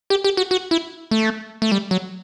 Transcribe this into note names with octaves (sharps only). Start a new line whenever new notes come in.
G4
G4
F#4
F#4
E4
A3
A3
G3
F#3